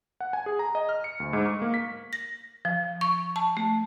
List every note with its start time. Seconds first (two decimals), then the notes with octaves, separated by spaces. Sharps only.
0.20 F#5
0.33 G#5
0.46 G#4
0.59 A#5
0.75 D#5
0.89 F6
1.04 C#7
1.20 D2
1.33 G#2
1.45 C#6
1.62 A#3
1.74 B6
2.13 A#6
2.65 F3
3.01 C#6
3.36 A5
3.57 A3